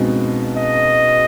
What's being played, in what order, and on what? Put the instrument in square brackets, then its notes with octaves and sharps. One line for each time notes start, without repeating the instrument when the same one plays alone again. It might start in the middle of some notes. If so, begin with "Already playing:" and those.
Already playing: [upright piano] C#2 B2 G#3 C4 D#4
[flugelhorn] D#5